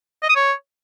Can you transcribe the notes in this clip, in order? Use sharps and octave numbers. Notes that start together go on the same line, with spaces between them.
D#5
D#6
C#5